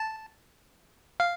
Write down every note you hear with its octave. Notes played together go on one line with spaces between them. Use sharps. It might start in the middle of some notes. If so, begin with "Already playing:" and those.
Already playing: A5
F5